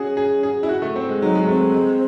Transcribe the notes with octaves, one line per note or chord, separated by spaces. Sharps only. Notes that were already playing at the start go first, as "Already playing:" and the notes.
Already playing: C#4 F#4 G#4
G#4
G#4
E4
F#4
A3
C4
G#3
F#3 D#4
G#3
A3 C4
G#3
G#3